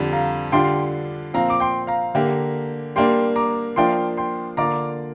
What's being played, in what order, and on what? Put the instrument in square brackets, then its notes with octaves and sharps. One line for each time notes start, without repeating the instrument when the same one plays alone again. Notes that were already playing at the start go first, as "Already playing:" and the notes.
Already playing: [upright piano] F2 D3 G3
[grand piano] F5 A#5
[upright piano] D3 G3 D4 F4 [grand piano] G5 C6
[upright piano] A#2 F3 C4 [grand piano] F5 A#5
[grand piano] D6
G5 C6
F5 A#5
[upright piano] D3 A#3 G4
[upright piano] G3 A#3 D4 [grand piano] G5 C6
[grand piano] A#5 D6
[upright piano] F3 A#3 D4 F4 [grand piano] G5 C6
[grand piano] G5 C6
[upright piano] D3 A#3 F4 D5 [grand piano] A#5 D6